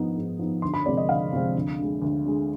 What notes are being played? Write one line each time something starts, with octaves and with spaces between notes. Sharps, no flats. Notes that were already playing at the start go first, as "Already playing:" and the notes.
Already playing: G#2 F3 B3 D#4
G#2
F3 B3 D#4
D2 C6
B5
C3 F3 G#3 C4 D5
D#5
D2 F5
C3 F3 G#3 C4
D2
D3 G#3
D2
D3 G#3